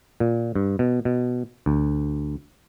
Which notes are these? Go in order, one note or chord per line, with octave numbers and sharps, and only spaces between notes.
A#2
G2
B2
B2
D2